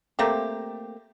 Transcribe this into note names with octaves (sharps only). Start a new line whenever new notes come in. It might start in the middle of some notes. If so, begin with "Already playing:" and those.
A3 A#3 C4 G4